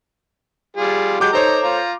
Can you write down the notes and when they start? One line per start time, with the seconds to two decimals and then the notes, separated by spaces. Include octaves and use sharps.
0.77 G3 F4 G#4
1.20 F#3 G#3 G4 D6 G6
1.33 D#4 A4 C5 C#5 A#5
1.64 F4 A#5